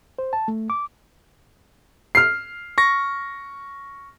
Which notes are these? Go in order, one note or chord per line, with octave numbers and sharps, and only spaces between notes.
C5
A5
A3
D6
F6 C7
C#6 A#6